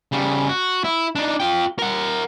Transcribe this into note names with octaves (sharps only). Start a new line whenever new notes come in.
C#3 G3
F#4
E4
D4 D#4
F4 G5
A#4 F#5